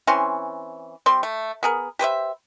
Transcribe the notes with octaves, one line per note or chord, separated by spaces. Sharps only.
E3 C4 C#4 C6
G3 C4 C6
A3
B3 G#4 A#4
G4 B4 C5 E5